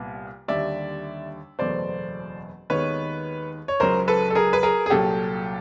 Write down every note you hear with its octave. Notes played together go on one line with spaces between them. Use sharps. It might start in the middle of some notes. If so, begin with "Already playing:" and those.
Already playing: C2 A#2 G3 B3
D#2 D3 G3 D5 E5
F#1 E2 B2 F#3 A3 C5 D5
D#2 D#3 G#3 B3 B4 C#5
C#5
C#2 C#3 F#3 A#4 C5
A4 B4
A4
G#4 A#4
B4
G#4 A#4
G#4
C2 A#2 F#3 G4 A4